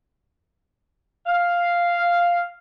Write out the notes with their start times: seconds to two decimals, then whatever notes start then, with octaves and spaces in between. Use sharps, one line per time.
1.26 F5